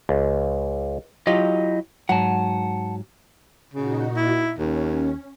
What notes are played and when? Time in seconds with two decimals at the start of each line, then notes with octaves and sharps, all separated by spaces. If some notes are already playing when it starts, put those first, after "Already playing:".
0.09 C#2
1.27 F#3 E4 F4 G4 D#5
2.09 G#2 F#3 F#5 A5
3.74 A#2 C#3 D#4 F#4
4.17 E4
4.59 D#2 C#4